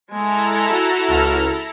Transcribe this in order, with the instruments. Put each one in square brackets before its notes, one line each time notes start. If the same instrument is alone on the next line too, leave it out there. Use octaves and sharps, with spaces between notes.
[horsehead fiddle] G#3 G#5 [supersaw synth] E4 A4 A#5
[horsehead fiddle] F#4
[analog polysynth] C#2 F6